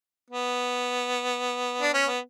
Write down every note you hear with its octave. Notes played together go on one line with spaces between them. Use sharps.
B3
D4
C#4
B3